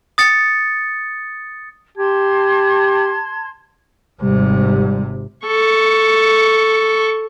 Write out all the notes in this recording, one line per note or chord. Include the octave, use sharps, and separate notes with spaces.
D#6 A6 C#7
G4 A5 C6 G#6
G#1 C3 G3
A4 C#6